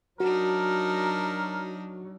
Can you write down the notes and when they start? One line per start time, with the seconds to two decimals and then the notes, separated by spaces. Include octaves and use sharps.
0.20 F#3 D4 D#4 F#4 A#4